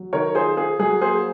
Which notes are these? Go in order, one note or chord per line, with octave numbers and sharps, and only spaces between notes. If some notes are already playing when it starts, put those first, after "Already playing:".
Already playing: F#3
D#3 A#4 C#5
F4 G#4 C5
F4 G#4
F#3 G#4
A#3 G#4 C5